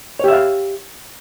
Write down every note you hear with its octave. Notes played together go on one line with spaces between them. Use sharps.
G4 C#5 E5 F5